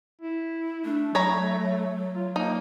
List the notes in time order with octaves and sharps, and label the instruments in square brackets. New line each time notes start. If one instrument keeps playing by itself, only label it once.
[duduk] E4
[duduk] A3 [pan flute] D4
[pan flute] F#3 [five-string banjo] C#5 A#5 B5
[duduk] F4
[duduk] A#3 [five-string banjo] D#4